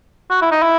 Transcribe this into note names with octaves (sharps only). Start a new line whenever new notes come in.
F#4
E4
D#4
E4